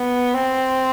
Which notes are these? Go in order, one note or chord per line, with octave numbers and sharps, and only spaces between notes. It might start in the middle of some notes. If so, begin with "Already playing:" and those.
Already playing: B3
C4